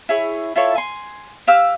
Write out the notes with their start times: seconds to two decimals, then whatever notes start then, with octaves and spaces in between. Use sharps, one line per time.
0.09 E4 G#4 C#5
0.56 E4 F4 A4 C#5
0.76 G#5 C6
1.47 G4 F5 E6